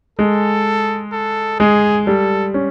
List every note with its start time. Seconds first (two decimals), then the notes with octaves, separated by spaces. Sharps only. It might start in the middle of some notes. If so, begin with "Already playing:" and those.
0.19 G#3 A4
1.13 A4
1.60 G#3 G#4
2.07 G3 A4
2.54 C#4